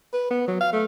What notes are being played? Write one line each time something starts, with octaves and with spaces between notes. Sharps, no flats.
B4
B3
F#3
F5
A3